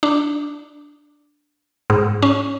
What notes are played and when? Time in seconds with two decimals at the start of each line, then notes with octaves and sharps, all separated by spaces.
0.03 D4
1.90 G#2
2.22 C#4